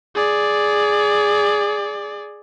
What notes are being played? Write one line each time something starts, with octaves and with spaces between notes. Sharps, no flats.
G#4 D5